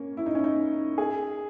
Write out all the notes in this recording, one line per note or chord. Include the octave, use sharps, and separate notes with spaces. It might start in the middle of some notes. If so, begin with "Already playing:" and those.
Already playing: A#3 C#4
E4
D#4
C#4
D#4
G#4